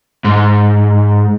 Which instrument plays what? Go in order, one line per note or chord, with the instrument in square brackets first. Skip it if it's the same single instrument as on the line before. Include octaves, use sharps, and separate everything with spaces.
[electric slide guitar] G#2